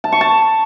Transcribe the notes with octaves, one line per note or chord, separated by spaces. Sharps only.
A5
C#6
A5